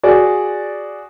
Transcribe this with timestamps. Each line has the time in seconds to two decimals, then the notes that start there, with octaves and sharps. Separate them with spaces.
0.03 F#4 G#4 D5